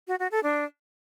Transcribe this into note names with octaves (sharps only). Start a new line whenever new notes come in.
F#4
F#4
A4
D4